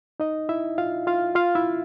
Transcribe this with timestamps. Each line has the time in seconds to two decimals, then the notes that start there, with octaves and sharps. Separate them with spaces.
0.20 D#4 D#5
0.49 E4 E5
0.78 F4 F5
1.07 F4 F5
1.35 F4 F5
1.55 E4 E5